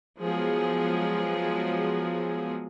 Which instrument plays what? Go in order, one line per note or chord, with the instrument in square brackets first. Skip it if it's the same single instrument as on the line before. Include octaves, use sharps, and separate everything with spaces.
[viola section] F3 F#3 G#3 B3 G#4